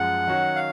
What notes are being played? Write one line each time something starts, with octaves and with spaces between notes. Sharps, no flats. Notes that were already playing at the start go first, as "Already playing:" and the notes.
Already playing: F#2 F3 G#3 F#5
D#3 F#3 C#4 F#4
F5